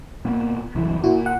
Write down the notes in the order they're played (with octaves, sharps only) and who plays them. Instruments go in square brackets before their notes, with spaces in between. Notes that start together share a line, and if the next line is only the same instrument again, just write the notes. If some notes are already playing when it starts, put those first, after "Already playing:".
[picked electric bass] A#2 A#3 B3
C2 F#2 E3
[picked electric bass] A#2 [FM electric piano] E4 F#4
[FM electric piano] F#5